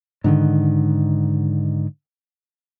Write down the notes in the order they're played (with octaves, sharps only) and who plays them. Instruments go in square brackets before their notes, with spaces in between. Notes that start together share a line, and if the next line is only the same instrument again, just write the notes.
[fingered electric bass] G#2 D3 D#3